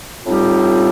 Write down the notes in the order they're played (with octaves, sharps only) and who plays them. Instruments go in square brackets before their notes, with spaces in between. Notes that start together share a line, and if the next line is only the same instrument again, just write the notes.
[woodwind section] A2 G3 C4 D#4 G4 [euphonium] F4